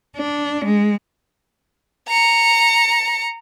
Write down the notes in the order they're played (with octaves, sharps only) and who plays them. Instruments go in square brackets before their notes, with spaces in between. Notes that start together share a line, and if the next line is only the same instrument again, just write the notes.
[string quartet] D4
G#3
[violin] A#5 C#7